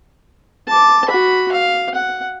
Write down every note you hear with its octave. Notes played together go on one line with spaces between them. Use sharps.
A5 D6
F#4 B5
F5
F#5